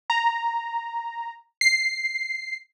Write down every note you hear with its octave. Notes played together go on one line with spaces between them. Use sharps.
A#5
C7